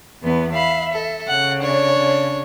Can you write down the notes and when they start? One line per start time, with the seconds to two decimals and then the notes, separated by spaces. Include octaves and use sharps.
0.22 E2 B3
0.54 E5 F5 B5
0.92 A4
1.28 C#3 F#5
1.60 D4 C#5
1.98 C#3